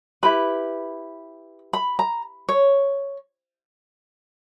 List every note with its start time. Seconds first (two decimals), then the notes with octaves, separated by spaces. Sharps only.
0.23 E4 G4 B4 B5
1.73 B5
1.99 A#5
2.49 C#5